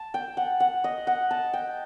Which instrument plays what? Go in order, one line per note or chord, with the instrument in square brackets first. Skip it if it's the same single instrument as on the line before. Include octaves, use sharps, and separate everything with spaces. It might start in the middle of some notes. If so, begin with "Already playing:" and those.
Already playing: [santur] A5
G5
F#5
F#5
D#5
F#5
A5
G5